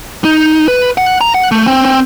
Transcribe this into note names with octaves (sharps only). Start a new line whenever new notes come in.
D#4
B4
F#5
A#5
F#5
A3
C4
C4